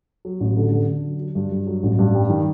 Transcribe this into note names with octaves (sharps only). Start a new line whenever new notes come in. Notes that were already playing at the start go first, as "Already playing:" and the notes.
F#3
A1
D3
D3
D3
F#3
F#3
G2
G2
F#3
A1
G2
G3
D#3